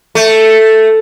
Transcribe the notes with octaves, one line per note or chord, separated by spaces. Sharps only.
A3